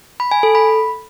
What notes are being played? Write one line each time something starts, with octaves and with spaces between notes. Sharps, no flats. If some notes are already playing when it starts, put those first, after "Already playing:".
B5
G#5
A4
B5